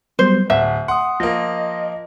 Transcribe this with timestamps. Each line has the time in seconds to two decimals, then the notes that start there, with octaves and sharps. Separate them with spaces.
0.19 F#3 G3 B3 C5
0.50 D1 E5 F#5
0.88 F#5 C6 D#6
1.20 F3 A#3 D#5